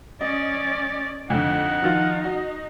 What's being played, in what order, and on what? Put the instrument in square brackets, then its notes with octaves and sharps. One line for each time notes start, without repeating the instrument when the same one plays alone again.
[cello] C#4 D5 [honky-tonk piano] D#5
[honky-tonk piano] F2 D3 [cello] D#4 [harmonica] F#5
[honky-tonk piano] D#3 F3 F4
F#4 D#5